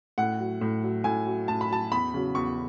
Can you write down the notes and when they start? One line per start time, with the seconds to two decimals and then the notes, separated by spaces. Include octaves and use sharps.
0.18 A2 F#5
0.39 F#3
0.61 A2
0.84 F#3
1.04 A2 G#5
1.26 F#3
1.48 A2 A5
1.61 B5
1.70 F#3 A5
1.92 E2 B5
2.14 C#3 F#3
2.35 E2 C#6